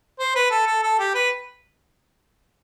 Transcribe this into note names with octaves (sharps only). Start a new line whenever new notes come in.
C5
B4
A4
A4
A4
G4
B4